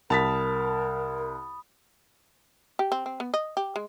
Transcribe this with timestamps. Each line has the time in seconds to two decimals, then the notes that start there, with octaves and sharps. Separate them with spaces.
0.10 C2 A#4 A5 B5 D#6 A6 B6
2.79 G4
2.92 C4
3.06 C4
3.20 B3
3.34 D#5
3.57 G4
3.76 G#3